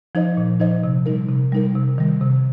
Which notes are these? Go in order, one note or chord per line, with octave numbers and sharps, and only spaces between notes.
F3 D#4 C5 D#5
A#2
F3 D#4 C5 D#5
C3
G3 D#4 A#4
C3
G3 D#4 A#4
C3
D#3 G3
C3